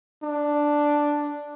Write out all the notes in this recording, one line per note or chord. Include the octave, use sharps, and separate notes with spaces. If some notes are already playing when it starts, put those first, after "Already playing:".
D4